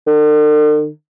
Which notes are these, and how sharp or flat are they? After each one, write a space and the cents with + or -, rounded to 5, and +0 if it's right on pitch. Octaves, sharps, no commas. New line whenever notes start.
D3 +45